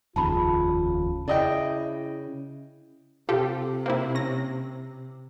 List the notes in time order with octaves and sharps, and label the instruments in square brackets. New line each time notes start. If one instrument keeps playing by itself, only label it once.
[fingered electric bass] F1 D#2 C#3 [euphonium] F4 [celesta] A5 B5
[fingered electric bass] C#3 [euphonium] E4 [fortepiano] D5 D#5 G5
[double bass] C3 [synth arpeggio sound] F4 G4 A4
[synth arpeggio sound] A#3 C4 E4
C#4 A#6